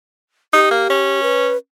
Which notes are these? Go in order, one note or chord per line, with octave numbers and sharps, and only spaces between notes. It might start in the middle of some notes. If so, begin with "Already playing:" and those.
D#4 G4
A#3
C#4
B4